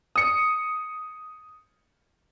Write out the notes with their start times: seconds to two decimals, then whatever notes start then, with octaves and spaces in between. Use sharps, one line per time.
0.16 D#6 C#7